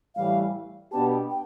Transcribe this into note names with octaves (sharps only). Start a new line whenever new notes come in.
A2 E3 G3 F5
B2 B3 D4 G4 A5
G5